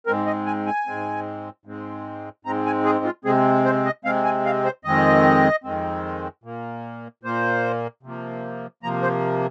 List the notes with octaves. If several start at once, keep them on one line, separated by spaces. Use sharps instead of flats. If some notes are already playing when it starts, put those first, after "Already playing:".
G#2 G#3 C4 A#4
D#5
G#5
G#5
G#2 G#3 C4
G#2 G#3 C4
G#2 G#3 C4 A#5
G#5
G#4
F4
C3 G#3 C4 G#4
C5
D#5
C3 G#3 C4 F5
G#5
F5
C5
F2 D#3 G#3 C4 D#5
F2 D#3 G#3 C4
A#2 A#3
A#2 A#3 C5
C3 F3 A#3
C3 F3 A#3 A#5
C5